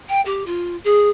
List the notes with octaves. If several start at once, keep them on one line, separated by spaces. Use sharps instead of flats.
G5
G4
F4
G#4